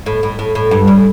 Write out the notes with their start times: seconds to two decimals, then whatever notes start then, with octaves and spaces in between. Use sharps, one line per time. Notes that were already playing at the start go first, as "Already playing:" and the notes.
0.06 A2
0.23 A2
0.39 A2
0.55 A2
0.71 G2
0.87 A2